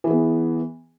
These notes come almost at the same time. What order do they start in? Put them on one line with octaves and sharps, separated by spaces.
E3 G#4 B3